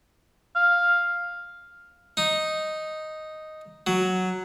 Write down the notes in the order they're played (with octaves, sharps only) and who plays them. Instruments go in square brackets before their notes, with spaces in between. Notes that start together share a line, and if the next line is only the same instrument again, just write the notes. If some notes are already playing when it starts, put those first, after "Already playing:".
[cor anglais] F5
[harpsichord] D#4
F#3